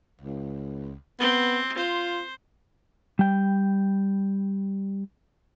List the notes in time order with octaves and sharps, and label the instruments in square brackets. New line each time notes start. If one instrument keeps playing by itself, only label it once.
[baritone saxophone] C#2
[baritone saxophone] B3 [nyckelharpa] C4
[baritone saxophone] F4 [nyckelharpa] C5
[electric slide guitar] G3 G5